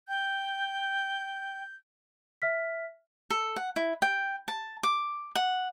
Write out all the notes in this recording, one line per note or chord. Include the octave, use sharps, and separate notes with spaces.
G5 G6
E5 F6 B6
A4
F#5
E4
G5
A5
D6
F#5